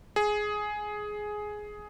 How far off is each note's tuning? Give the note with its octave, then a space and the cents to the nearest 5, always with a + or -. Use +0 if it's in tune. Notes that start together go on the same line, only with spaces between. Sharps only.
G#4 +10